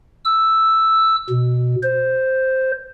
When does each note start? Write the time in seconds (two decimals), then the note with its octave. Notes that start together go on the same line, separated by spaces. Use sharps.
0.25 E6
1.30 B2
1.83 C5